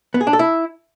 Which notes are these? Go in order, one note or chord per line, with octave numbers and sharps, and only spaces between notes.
B3
G#4
D4
A4
E4